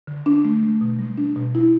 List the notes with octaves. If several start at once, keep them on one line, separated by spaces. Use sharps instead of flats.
D3
D4
A3
A3
B2
G3
D4
B2
E4